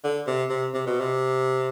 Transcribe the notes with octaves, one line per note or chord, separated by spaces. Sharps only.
D3
C3
C3
C3
B2
C3